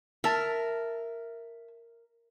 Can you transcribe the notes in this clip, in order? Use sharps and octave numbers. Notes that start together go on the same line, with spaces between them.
A#4 E5 A5